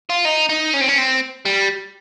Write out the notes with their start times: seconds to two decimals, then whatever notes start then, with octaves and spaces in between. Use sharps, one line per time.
0.10 F4
0.25 D#4
0.50 D#4
0.74 C#4
0.81 C4
0.89 C#4
0.98 C4
1.46 G3